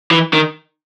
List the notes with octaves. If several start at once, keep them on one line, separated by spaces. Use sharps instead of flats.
E3
D#3